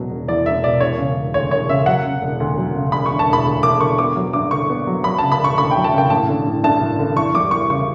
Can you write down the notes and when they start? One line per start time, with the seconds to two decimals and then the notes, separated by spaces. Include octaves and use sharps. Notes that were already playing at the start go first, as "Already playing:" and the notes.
Already playing: E1 B2 F#3
0.11 E1
0.28 E2 D5
0.46 E1 E5
0.63 B2 D5
0.80 E1 C#5
0.98 C#3
1.17 E1
1.34 D2 C#5
1.51 E1 C#5
1.69 C#3 E5
1.86 F#3 F#5
2.04 C#3
2.22 E1
2.40 D2
2.57 F#3
2.74 C#3
2.92 E1 B5
3.06 C#6
3.11 D3
3.19 A5
3.28 E1 B5
3.46 D2
3.63 E1 D6
3.81 D3 C#6
3.98 B3 D6
4.16 F#3
4.33 G2 D6
4.51 D3 C#6
4.69 B3
4.87 F#3
5.04 F#3 B5
5.18 C#3 A5
5.32 B5
5.40 E1 C#6
5.58 D2 B5
5.71 F#3 G5
5.84 A5
5.93 C#3 G5
6.10 A1 A5
6.29 D3
6.46 A1
6.64 G2 A5
6.81 A1
6.99 D3
7.16 E2 C#6
7.34 G3 D6
7.51 E2 C#6
7.70 C#3 C#6